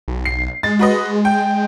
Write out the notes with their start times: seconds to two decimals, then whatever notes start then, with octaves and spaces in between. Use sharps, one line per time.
0.08 B1
0.25 C7
0.63 G#3 A6
0.79 F#4 B4 D#5
1.25 G5